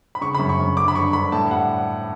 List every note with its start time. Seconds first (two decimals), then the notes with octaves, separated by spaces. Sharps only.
0.15 B5
0.21 C#3 C#6
0.35 B5
0.39 F#2
0.49 C#6
0.59 F#2
0.77 D3 D6
0.88 B5
0.95 G2 C#6
1.13 D3 B5
1.32 A2 A5
1.51 G3 F#5